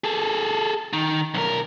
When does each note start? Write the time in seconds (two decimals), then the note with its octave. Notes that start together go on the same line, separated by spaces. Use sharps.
0.04 G#4 A4
0.93 D#3
1.34 B1 A#4